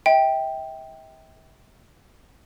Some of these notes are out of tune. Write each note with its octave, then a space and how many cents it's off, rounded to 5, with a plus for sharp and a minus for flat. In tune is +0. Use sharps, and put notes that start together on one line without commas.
E5 -40 G5 +0